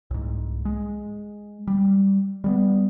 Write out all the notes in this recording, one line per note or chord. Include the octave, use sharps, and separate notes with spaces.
C2 G#2
G#3
G3
G3 G#3 B3